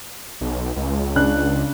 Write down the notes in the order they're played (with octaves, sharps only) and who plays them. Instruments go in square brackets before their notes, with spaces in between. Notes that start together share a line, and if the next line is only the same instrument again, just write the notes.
[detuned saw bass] B1
C#2
[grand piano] C#3 D4 F#6